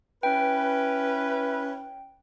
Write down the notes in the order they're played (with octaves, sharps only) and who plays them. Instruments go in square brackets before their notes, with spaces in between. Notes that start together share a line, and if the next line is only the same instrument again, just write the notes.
[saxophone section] C#4 E4 B4 [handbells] G5